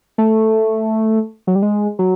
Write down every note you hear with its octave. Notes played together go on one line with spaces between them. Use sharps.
A3
F#3
G3
G#3
F#3